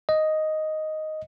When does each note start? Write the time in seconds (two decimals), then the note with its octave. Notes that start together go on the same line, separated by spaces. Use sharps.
0.09 D#5